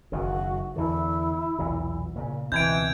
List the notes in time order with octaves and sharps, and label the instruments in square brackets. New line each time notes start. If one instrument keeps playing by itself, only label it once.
[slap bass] F#1 F#2 D#3 [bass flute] F#4
[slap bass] E2 D3 [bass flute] E4
[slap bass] B1 E2 A#2
A#2 C#3
[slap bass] C#2 B2 C4 [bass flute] E3 [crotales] G6 G#6 D7